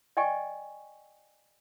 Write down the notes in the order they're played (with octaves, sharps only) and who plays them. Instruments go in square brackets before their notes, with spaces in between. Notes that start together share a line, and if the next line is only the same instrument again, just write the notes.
[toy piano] D5 D#5 G5 G#5 C#6